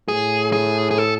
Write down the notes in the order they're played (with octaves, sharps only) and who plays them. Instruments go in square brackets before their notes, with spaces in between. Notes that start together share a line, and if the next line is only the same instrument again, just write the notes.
[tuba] A2 [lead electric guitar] G#4
[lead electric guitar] G#4
G#4
A4